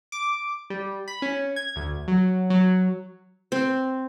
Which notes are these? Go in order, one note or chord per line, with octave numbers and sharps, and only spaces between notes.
D6
G3
B5
C#4
G#6
D2
F#3
F#3
C4